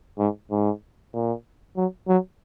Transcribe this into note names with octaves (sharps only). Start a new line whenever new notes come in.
G#2
G#2
A#2
F#3
F#3